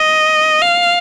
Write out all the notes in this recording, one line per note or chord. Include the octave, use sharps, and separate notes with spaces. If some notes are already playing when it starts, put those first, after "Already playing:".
Already playing: D#5
F5